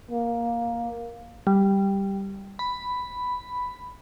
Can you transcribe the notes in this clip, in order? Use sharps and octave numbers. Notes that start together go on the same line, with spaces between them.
A#3
G3
B5